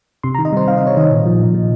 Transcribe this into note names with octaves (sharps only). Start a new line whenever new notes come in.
C3 C6
A#5
D#3
D#5
G3 C5
C3 F5
C3 D#5
C#5
D#3 D#5
A#2
F3
A#2
F3